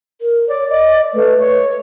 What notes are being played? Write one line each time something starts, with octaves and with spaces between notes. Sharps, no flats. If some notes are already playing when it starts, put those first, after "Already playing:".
A#4
C#5 D5
D5 D#5
A3 B4
C#5